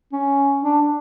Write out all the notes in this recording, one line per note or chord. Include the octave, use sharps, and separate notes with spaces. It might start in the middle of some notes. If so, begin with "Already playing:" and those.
C#4
D4